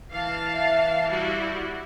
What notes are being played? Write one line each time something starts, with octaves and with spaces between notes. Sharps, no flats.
E3 F5 A5
E5
G3 E4 F#4